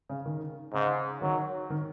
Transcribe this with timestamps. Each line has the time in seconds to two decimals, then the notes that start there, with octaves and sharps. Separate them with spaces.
0.10 C#3
0.26 D#3
0.74 G#2 C#3
1.22 D#3 F#3
1.70 D#3